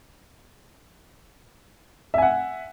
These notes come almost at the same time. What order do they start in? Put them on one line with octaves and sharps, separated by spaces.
E5 G#5 F#5